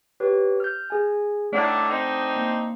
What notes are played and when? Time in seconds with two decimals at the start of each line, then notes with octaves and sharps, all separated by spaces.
0.20 G4 B4 C#5
0.60 F6 G6
0.90 G#4 G#5
1.52 A2 D#3 A3 D4 F#5
1.89 C4 D4 D#4
2.36 A#3